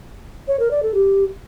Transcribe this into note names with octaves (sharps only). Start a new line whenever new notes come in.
C#5
A#4
D5
A4
G4